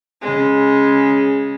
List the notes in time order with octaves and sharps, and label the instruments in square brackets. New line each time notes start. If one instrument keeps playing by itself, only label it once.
[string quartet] C#3 G#3